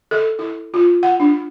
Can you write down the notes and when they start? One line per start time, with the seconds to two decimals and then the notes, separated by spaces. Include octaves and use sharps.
0.11 A4
0.39 E4
0.74 F4
1.03 F#5
1.20 D4